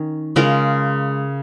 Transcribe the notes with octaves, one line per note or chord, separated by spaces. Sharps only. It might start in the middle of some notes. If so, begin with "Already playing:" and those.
Already playing: D#3 C#4
C#3 G#3 F4 A#4